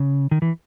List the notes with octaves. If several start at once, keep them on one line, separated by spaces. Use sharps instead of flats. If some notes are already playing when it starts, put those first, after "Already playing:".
Already playing: C#3
D#3
E3